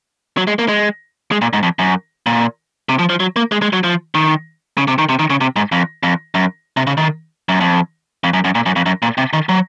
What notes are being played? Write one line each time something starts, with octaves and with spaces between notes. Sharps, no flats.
F#3
G#3
A#3
G#3
G#3
A#2
G#2
F2
F#2
A#2
C3
F3
F3
F#3
A#3
G#3
G#3
F#3
F3
D#3
C#3
C3
D#3
C3
D#3
C#3
C3
G#2
F2
F2
F#2
C3
C#3
D#3
F#2
F2
F2
F#2
F#2
A#2
F#2
F2
F#2
A#2
C3
D#3
F#3